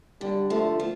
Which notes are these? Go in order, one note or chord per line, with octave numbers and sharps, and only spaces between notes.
D3 G3
F3 A3
F3